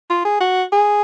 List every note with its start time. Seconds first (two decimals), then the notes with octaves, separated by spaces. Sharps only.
0.10 F4
0.25 G#4
0.41 F#4
0.72 G#4